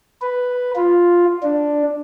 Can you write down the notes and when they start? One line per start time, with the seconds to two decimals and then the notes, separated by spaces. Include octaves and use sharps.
0.22 B4
0.76 F4
1.43 D4